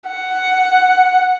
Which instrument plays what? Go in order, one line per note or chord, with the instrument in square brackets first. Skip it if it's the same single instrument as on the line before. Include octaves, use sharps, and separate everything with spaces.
[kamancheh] F#5